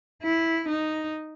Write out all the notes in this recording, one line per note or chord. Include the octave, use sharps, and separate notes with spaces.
E4
D#4